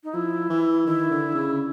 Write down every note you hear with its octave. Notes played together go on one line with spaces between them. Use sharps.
D#4
F3 E4
E3
D#3 E4
D3
C#3